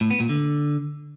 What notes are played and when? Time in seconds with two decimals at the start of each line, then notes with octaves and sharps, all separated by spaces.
0.01 A2
0.10 B3
0.20 A#2
0.29 D3